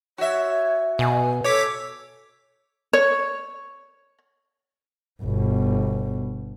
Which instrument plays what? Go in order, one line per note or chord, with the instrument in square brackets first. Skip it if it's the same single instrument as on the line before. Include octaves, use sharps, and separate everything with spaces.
[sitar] F#4 E5 [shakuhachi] C#5
[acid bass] B2 [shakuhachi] G#5
[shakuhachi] A4 [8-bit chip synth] C#5 D6 B6
[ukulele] C#5
[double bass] G1 B2